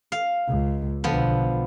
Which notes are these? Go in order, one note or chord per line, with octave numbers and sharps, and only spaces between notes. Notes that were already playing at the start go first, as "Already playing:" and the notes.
F5
C#2
B1 D3 F3 B3